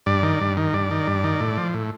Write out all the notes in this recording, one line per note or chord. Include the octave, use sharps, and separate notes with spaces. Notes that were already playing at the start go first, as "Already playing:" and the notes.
G2 D5
D#3
G2
D#3
G2 D5
D#3
G2
D#3
A2
F3
A2